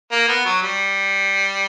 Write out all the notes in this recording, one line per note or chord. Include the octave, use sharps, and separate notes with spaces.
A#3
B3
F#3
G3